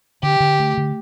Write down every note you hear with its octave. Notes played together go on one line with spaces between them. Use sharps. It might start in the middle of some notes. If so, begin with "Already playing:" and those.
D3 G4
D3
A3
D3